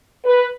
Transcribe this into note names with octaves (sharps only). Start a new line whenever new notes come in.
B4